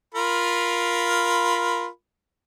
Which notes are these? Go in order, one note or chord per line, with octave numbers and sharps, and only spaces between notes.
F4 A#4 B5